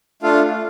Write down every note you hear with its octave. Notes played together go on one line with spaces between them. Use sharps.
A3 D4 F4 A4 F5